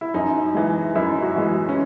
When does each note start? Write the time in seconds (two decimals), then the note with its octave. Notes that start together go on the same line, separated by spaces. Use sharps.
0.01 E4
0.14 F#2 D#4
0.54 E3 G#3
0.95 F#2 E4
1.22 F#4
1.36 E3 G#3
1.69 C#4